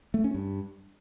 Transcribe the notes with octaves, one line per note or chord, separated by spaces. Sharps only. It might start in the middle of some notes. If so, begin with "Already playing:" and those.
A3
C#4
G2